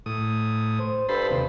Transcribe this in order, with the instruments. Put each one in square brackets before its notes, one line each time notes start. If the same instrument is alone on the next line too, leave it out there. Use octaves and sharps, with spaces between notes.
[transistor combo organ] A2 D#6
[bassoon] C5
[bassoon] G2 [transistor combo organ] A4 C5 B5
[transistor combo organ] D#2 C3